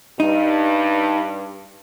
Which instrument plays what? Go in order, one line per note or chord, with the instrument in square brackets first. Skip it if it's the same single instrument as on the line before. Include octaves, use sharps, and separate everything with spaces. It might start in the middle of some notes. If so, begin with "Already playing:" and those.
[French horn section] G2 [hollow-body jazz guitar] D#4